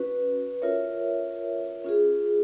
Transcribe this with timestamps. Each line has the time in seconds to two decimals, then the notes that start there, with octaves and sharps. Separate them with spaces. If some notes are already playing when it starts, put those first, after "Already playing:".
Already playing: C#4 F#4 B4
0.62 F4 A#4 C#5 E5
1.84 C#4 F4 G#4